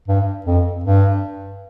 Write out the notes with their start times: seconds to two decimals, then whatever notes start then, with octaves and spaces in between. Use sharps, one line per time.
0.08 G2
0.46 F2
0.84 G2